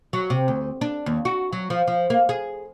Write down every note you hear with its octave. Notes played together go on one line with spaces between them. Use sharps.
F#3
C3
D2
D4
D#2
F#4
F#3
F3
F3
A#3
G#4